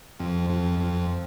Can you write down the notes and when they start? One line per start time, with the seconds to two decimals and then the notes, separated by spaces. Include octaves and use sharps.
0.19 F2 C4
0.50 F2
0.80 F2